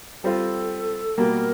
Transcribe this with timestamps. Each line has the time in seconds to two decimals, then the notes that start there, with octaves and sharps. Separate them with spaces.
0.24 G3 C4 F4 A4
1.17 B2 G3 A#3 A#4